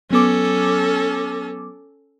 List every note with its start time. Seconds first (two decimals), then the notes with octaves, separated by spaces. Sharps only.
0.11 F#3 B3 C#4 A4 D6